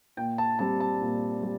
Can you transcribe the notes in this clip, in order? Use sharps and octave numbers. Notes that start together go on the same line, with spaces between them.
A#2 G5
A5
G3 C4 A5
A5
A#2
G3